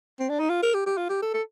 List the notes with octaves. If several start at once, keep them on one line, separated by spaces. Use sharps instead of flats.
C4
D4
D#4
F4
A#4
G4
G4
F4
G4
A4
A4